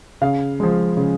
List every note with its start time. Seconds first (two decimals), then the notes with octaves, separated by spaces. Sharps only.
0.21 C#3 F5
0.60 F3 G#3
0.97 C#3